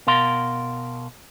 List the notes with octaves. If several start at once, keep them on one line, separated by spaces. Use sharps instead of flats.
B2 A#4 F5 C6